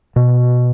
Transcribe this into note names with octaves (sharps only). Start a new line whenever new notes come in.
B2